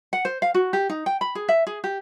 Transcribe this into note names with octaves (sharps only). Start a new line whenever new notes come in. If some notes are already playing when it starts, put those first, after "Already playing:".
F#5
C5
F5
F#4
G4
D#4
G5
B5
G#4
E5
G#4
G4